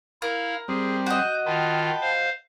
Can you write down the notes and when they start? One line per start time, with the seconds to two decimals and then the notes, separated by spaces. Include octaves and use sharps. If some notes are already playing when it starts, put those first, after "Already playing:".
0.22 E4 A#4 F5
0.68 G3 C4 G#4
1.06 F#4 D#5 G6
1.46 D#3 F4 G5 A5 B5
2.01 C5 F5